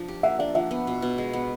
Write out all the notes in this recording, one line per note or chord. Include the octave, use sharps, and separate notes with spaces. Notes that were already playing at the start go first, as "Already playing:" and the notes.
Already playing: F3 D4
G4
A#3 E5 F#5
D4 D5 E5
F3 E5 F#5
B3
B2
B2
G#3
B3